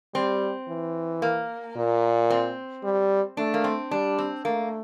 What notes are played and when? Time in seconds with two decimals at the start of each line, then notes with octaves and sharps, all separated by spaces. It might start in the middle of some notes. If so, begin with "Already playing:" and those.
0.14 G3 C4
0.68 E3
1.22 A#3
1.76 A#2
2.30 C4
2.84 G3
3.37 A3 D4
3.54 A#3
3.64 C4
3.91 G3 D4
4.18 C4
4.45 A3 A#3